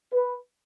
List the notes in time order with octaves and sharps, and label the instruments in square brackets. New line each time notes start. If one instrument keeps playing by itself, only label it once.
[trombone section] B4